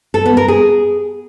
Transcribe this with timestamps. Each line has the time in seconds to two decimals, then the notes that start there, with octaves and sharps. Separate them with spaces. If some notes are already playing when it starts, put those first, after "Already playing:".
0.14 A4
0.25 B3
0.37 A#4
0.48 G#4